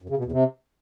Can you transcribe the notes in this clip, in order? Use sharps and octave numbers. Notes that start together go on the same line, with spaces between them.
F#2
C#3
B2
E2
C3